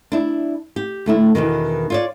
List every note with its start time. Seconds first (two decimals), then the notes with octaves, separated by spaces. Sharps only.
0.12 D4 E4
0.76 G4
1.06 D2 A3 E4
1.35 E2 G#2 B2 D#3
1.90 F4 C#5 D5